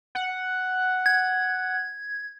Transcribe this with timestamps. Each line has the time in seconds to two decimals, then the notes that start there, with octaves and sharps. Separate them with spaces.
0.15 F#5
1.06 G#6